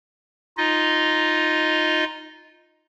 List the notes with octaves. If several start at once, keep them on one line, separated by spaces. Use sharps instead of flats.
D#4 F4 D#5